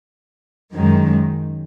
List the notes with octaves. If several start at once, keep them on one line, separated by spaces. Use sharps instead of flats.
F#2 D#3 G#3